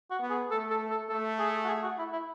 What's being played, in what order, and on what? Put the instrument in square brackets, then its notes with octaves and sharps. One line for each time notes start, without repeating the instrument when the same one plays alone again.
[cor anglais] F#4
[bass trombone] B3
[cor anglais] G#4
[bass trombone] A3 [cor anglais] A4
[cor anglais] A4
A4
[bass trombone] A3 [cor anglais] A4
[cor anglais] G#4
F#4
G#4
F#4
E4
E4